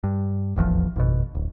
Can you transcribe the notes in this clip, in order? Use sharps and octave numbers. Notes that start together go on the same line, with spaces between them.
G2
D#1 A1 E2 F3
G#1 F2 B2
D1